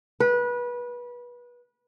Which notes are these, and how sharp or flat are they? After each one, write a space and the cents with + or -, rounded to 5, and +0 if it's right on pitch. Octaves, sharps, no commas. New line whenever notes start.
B4 -25